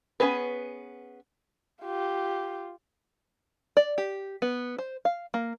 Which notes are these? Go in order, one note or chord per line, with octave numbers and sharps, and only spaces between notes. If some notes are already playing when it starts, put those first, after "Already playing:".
B3 C#4 G#4 A#4 B4
F4 G4
D5
G4
B3
C5
F5
A#3